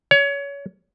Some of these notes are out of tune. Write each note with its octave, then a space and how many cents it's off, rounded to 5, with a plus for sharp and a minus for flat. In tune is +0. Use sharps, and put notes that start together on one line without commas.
C#5 +25